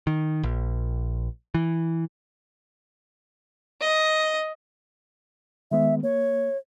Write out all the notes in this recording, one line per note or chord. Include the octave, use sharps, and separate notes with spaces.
D#3
A#1
E3
D#5
D#3 G#3 B3 E5
A#3 C#5